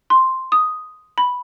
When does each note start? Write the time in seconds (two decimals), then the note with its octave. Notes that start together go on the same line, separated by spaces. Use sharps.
0.10 C6
0.52 D#6
1.18 B5